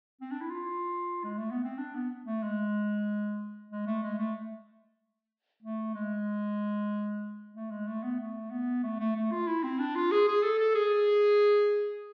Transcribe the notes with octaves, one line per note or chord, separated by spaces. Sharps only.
C4
D4
E4
F4
G#3
A3
B3
C4
D4
B3
A3
G#3
G#3
A3
G#3
A3
A3
G#3
A3
G#3
A3
B3
A3
B3
A3
A3
A3
F4
E4
C4
D4
F4
G#4
G#4
A4
A4
G#4